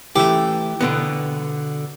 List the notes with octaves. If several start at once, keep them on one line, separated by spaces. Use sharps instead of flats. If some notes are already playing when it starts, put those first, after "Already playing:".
E3 A3 G4
B2 D3 B3